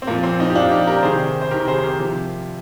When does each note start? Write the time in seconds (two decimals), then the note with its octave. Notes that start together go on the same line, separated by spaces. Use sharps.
0.02 C4
0.07 A#2 F3 A#3
0.23 C4
0.39 C4 D#4
0.50 G4
0.55 A#2 F3 D4 F4
0.71 D#4 G4
0.87 G4 A#4
1.03 C3 D#3 G#4 C5
1.42 C5
1.51 C3 D#3 G4 A#4
1.67 G#4 C5
1.78 C5
1.83 G4 A#4
1.99 C3 F3